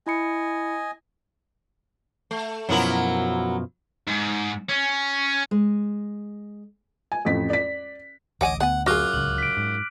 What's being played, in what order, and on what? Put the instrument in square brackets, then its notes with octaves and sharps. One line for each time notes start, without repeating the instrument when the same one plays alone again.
[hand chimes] E4 B5 C#7 [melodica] D#5 G#5
[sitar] A3
[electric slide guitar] F#2 B2 F3 [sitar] F#3 E4 A#4
[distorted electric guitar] G#2
C#4
[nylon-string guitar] G#3
[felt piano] G#5
A1 F2 B6
D5 B6
[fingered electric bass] D1 A1 [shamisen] C#5 F#5 G#5 [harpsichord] D#5 D6
[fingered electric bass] D2 [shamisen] B3 G#5 [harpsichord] F#5
[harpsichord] F#2 F4 [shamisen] F#4 G#4 [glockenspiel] D6 F6 F#6
[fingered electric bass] D1 C#2 [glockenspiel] F#7
[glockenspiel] B6 D7
[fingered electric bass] G#2